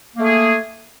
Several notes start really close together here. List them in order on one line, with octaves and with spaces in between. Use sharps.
A#3 A3 G#4